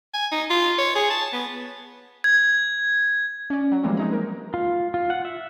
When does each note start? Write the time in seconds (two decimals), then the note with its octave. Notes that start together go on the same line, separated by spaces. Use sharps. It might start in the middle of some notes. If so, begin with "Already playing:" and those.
0.14 G#5
0.32 D#4
0.50 F4
0.78 C#5
0.95 G#4
1.10 A5
1.33 B3
2.24 G#6
3.50 C#4 D5
3.72 F#3
3.83 E3 F3 G3 G#3 A#3 C4
3.97 G#3 D#4 A#5
4.13 A#4
4.54 F4
4.94 F4
5.10 F#5
5.25 E5